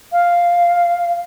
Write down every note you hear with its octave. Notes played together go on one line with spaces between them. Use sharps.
F5